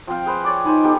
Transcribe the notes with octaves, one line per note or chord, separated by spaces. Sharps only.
F3 C4 F5 G5
G#4 B4 C5
C#5 D5 D6
D#4 C5 G#5 B5
B3 G4 A4